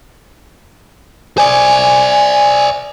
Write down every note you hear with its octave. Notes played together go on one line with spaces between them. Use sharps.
C5 D5 G#5